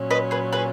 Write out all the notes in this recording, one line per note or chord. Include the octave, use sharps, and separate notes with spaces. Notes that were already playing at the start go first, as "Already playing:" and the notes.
Already playing: A#2 F#3 C#4
B4 D#5
G#4 B4
G#4 B4